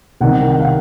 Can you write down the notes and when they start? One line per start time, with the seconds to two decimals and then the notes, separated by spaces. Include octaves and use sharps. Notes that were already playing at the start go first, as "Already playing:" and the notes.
0.21 C2 C3 D#3 F#5
0.53 F#5
0.60 F5